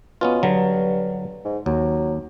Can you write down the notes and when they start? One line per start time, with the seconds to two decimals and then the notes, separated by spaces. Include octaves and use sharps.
0.21 B2 B3 C#4 F4
0.43 G2 D3 F#3
1.45 G#2
1.66 D#2 F#3